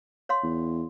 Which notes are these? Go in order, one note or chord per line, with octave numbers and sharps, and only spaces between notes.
C#5 F5 C6
E2